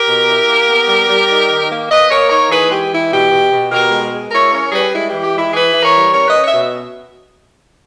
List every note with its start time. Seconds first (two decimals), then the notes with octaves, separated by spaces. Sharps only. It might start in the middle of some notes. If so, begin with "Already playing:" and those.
Already playing: G4 A#4
0.08 B2
0.29 E4
0.48 A#3
0.69 B3
0.88 G3
1.09 G3
1.30 D#4
1.49 D#3
1.70 A#3
1.90 A#3 B4 D#5
2.10 A#3 A#4 C#5
2.30 D#4 A#4 C#5
2.50 E3 G#4 B4
2.71 G#3 G4
2.91 E3 E4
3.11 B2 G4
3.31 B2
3.51 B2
3.71 B2 G4 A#4
3.91 G#3
4.12 G#3
4.32 E4 A#4 C#5
4.52 C#4 A#4 C#5
4.72 G3 G#4 B4
4.92 G#3 E4
5.08 E3 G4
5.23 G4
5.33 G#3 E4
5.53 E3 G#4 B4
5.73 E3
5.83 A#4 C#5
5.94 G3
6.13 C#4 A#4 C#5
6.28 B4 D#5
6.34 C#4
6.43 C#5 E5
6.54 B2